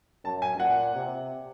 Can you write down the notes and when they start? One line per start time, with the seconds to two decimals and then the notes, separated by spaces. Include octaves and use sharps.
0.24 F#2 A5
0.42 G#5
0.59 A#2 F#5
0.95 C3